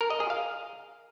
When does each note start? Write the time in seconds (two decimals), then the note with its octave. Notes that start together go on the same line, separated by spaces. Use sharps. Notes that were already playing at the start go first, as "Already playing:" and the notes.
0.01 A#4
0.10 D#5
0.20 G#4
0.30 F5